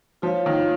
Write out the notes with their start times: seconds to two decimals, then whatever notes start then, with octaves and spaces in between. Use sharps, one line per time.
0.22 F3 F4 C#5 F5
0.46 D#3